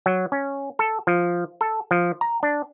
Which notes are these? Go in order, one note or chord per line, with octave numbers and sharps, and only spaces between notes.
F#3
C#4
A4
F3
A4
F3
A#5
D4